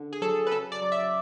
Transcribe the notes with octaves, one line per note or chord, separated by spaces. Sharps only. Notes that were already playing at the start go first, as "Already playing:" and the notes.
Already playing: D3
G#4
F#3 A4
B4
C#3 A4
D5
F#3
E5